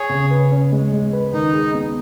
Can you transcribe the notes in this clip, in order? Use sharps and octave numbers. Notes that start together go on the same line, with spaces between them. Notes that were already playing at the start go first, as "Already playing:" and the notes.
Already playing: G#4 C#5
C#3
B4
C#4
G#3
G#3
B4
D#3 D#4
G#4
B3